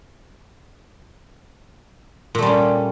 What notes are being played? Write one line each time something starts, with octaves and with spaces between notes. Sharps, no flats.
A#2 G3 A3 C#4